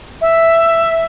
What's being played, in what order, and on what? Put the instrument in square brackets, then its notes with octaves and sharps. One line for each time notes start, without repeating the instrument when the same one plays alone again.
[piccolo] E5